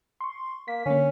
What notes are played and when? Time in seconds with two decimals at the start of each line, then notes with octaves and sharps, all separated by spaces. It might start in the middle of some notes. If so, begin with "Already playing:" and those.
0.21 C6 C#6
0.68 A#3 B6
0.86 D3 A#3 C#4